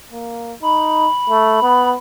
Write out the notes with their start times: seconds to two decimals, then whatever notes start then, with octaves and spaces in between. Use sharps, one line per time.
0.13 A#3
0.63 D#4 B5
1.30 A3
1.63 B3